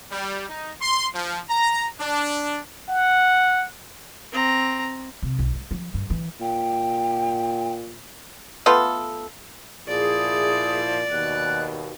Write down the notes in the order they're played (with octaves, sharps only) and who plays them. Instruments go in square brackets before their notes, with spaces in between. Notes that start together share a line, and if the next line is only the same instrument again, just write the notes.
[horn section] G3
D#4
C6
F3
A#5
D4
[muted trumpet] F#5
[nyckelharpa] C4 A#5
[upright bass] C3
B1
G#3
F3
G2
E3
[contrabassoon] A#2 [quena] G5
[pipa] A3 B3 F4 A4
[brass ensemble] A#2 F3 E4 [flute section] G#4 [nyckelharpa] D5
[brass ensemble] D#2 B2 [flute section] F#6